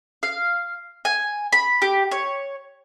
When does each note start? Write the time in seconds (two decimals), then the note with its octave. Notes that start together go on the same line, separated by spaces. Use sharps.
0.23 F5
1.05 G#5
1.53 B5
1.82 G4
2.12 C#5